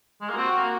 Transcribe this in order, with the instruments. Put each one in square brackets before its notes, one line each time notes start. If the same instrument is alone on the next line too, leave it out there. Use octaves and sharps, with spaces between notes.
[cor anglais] G#3
A#3
[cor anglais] C4 [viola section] F#4
[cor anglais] A#3